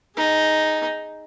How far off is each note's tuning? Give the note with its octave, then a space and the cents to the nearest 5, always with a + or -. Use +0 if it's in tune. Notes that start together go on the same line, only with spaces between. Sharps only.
D#4 +0 G#4 +0